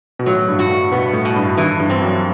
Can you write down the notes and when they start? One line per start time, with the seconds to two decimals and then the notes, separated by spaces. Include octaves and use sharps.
0.19 B2
0.26 A2 F#3
0.48 G2
0.59 F#4
0.70 A2
0.91 B2 B3
1.13 A2
1.25 B2
1.36 G2
1.57 G2 E3
1.80 G2
1.90 C4
2.01 F#2